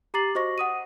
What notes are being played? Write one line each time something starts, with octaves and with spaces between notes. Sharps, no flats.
G4 A#5 D6 A6 C7 F#7
F#4 C5 D#5 C#6 A#6
F#5 D#6 D#7